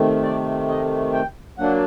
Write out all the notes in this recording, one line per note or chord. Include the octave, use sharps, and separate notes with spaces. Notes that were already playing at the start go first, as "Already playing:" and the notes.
Already playing: C3 D#3 A3
D5
D#5
G5
F#3 A#3 D4 F#5